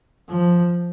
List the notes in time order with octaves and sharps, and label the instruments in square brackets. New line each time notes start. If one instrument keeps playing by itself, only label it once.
[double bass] F3